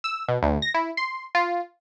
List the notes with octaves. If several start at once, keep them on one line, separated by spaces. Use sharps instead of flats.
E6
B2
D2
A#6
E4
C6
F4